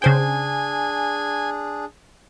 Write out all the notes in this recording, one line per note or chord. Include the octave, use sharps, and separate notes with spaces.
C#3 D4 G#4 C5 G5 G#5